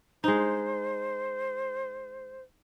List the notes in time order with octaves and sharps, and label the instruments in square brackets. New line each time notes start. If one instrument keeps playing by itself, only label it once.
[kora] G#3 D#4 [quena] C5